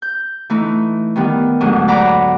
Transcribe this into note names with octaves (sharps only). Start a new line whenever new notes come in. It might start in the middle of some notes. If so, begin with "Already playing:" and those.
G6
E3 A3 D#4
D#3 G3 B3
D2 G#2 F#3 A3 D4 D#6
D5 F#5 A#5 B5 D6